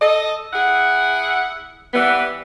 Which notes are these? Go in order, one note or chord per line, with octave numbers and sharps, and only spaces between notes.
A4 D#5
E4 G#4 F#5
E3 G3 B3